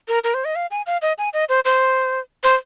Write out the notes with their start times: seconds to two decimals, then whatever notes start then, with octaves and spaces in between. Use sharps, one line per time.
0.08 A#4
0.24 A#4
0.34 C5
0.45 D#5
0.56 F5
0.71 G#5
0.86 F5
1.02 D#5
1.18 G#5
1.34 D#5
1.49 C5
1.65 C5
2.43 C5